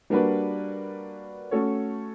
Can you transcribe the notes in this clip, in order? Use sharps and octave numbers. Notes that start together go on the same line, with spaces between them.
G3 A#3 D4 F#4 B4
A3 C#4 F#4 A4 C#5